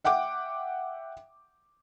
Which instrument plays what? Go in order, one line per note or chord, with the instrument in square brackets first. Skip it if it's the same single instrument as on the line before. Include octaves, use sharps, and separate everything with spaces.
[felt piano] E5 F#5 G5 D6